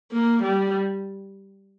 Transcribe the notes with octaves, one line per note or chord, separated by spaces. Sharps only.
A#3
G3